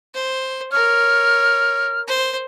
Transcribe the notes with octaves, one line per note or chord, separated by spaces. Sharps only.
C5
A#4 C#5 F6
C5